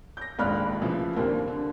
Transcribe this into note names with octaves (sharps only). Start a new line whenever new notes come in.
G6 A#6
D#1 A#1 G#2 B5 F6 F#6
C#3 E3 F3 A3
D#2 A#2 D3 G3 A#3 C4
D3